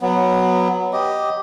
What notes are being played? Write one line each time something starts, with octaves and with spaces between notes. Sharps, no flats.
F#3 B3
G4 D#5